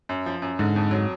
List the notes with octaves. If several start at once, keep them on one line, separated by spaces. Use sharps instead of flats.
F#2
F3
F#2
G#2 D3
F2
F#3